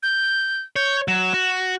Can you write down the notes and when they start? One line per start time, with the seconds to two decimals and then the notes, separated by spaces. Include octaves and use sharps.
0.03 G6
0.76 C#5 G6
1.08 F#3 E7
1.34 F#4